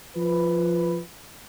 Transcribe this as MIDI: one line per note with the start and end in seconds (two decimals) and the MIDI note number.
0.16 0.99 53
0.16 1.00 71